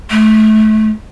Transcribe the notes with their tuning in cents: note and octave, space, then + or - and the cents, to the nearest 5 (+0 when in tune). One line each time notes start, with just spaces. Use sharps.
A3 -25